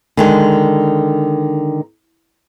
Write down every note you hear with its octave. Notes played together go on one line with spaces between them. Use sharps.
D3 D#3 G#3